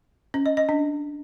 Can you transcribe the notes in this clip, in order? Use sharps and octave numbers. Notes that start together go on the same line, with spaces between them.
C#4
D#5
D#5
D4